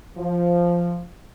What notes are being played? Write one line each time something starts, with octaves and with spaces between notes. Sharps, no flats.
F3